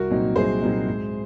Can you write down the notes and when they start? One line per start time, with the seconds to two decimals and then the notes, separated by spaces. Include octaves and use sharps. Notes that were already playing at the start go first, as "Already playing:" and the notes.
Already playing: C2 F#4 A#4
0.11 A#2 F#3 C4 D#4
0.36 C2 G#4 C5
0.62 A#2 F#3 C4 D#4
0.86 G#2